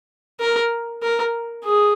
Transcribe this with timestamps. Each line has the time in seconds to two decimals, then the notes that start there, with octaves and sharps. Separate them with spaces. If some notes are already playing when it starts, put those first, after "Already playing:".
0.40 A#4
1.03 A#4
1.64 G#4